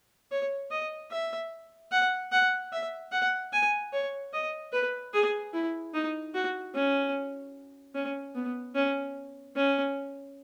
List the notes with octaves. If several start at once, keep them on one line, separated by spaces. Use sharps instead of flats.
C#5
D#5
E5
F#5
F#5
E5
F#5
G#5
C#5
D#5
B4
G#4
E4
D#4
F#4
C#4
C#4
B3
C#4
C#4